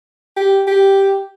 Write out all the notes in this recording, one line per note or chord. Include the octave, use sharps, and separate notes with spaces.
G4
G4